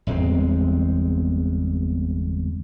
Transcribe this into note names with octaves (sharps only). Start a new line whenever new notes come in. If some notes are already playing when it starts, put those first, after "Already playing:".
G1 E2 G#3 C4